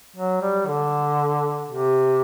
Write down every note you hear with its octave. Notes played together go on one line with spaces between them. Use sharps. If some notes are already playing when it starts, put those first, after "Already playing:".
F#3
G3
D3
C3